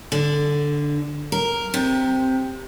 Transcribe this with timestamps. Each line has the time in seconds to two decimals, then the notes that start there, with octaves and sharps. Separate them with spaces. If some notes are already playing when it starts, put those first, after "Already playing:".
0.12 D3
1.32 A#4
1.74 C3